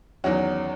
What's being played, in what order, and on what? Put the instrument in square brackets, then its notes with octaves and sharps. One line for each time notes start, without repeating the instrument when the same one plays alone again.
[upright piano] E2 D#3 F#3 C#4 F#4